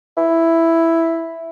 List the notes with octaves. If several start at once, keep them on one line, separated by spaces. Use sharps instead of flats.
E4